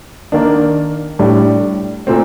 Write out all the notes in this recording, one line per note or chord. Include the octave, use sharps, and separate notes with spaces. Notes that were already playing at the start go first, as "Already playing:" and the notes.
D#3 A#3 D4
A2 G3 D4
A#2 A3 C4